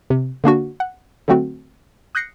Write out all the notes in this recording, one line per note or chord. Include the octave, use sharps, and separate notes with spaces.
C3
D3 A#3 D4 F#4
F#5
D3 F#3 A3 C4 F#4
D#6 F#6 G6 A#6 C7 C#7